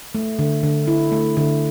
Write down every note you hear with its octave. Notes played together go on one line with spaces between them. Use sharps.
A3
D3
D3
E4
A3
D3